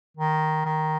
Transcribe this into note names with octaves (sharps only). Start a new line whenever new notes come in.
D#3
D#3